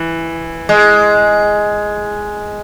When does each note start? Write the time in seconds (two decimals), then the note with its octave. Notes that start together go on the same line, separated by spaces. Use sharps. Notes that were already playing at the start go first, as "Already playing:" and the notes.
Already playing: E3
0.69 G#3